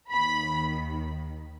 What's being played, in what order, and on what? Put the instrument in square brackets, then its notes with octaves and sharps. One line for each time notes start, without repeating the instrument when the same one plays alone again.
[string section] D#2 D#3 B5